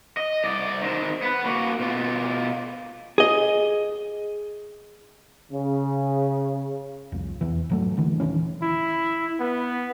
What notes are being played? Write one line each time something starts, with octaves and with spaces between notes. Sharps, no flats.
D#5
C2 D5
D#3 C4
B3 B4
A#3 F#4
B2 F4
G#4 D#5
C#3
C2 F2
E2 E3
G#1 F#3 A3
D#2 D3 E3
D#1 D#3 E3 C#4
E4
B3